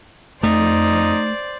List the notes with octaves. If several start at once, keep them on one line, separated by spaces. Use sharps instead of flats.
F2 A3 D#4 C5 D5